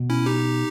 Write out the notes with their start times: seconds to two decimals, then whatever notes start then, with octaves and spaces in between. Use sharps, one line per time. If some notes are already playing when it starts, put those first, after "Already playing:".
Already playing: B2
0.10 C#4 E4
0.26 D#4 G4